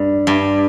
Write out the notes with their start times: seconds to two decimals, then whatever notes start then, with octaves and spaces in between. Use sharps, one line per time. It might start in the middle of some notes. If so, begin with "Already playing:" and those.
Already playing: G2
0.27 G2